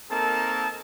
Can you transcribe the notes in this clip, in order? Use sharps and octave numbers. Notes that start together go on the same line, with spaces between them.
A#3 C4 D#4 A4 A#4 A5